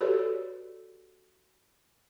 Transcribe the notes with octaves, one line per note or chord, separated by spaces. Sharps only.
F#4 G4 A4 B4 C#5 D5